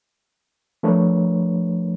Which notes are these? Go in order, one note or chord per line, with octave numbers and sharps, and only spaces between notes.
F3 A3 D4 A#4 B4 C#5